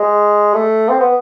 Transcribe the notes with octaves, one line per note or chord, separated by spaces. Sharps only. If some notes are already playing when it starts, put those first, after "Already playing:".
Already playing: G#3
A3
C4
B3